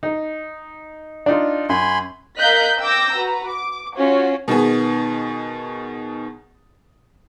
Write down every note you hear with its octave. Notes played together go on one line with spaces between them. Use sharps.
D#4
D4 D#4 F4
F#2 G#5 B5 C6
A#4 D#5 F5 F#6 G6 B6
G5 D6 E6 G6 A#6
F#4 B4 A#5
D6
C#4 F4 F#4 C#5
B2 D#3 B3 G#4